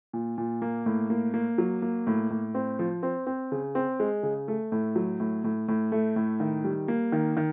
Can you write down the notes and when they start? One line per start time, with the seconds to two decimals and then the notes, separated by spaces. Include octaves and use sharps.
0.13 A#2
0.38 A#2
0.62 A#3
0.86 A2
1.10 A#3
1.34 A#3
1.58 F#3
1.82 A#3
2.07 A2
2.30 A2
2.55 C4
2.79 F3
3.03 C4
3.27 C4
3.52 C#3
3.75 C4
4.00 G#3
4.23 C#3
4.48 A3
4.72 A2
4.96 F#3
5.20 A2
5.44 A2
5.68 A2
5.92 A3
6.16 A2
6.40 D#3
6.64 G3
6.88 A#3
7.12 D#3
7.37 D#3